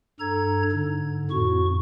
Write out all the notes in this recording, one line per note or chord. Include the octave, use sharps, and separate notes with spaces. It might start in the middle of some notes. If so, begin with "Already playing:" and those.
G2 A4 A#5 G#6
G#2 D3
F2 A2 F#4 C#6